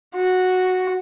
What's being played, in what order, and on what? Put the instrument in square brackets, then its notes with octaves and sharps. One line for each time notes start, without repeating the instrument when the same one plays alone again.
[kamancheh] F#4